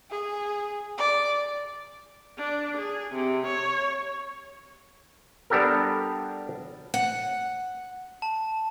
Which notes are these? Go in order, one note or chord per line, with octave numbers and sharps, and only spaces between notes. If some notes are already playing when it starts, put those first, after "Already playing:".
G#4
D5
D4
G#4
C3
C#5
G3 B3 D4 G4 A4 A#4
F#5
A5